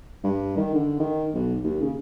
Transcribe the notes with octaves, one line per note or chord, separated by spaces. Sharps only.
G2
D#3
D3
D#3
B1
D#2
C#3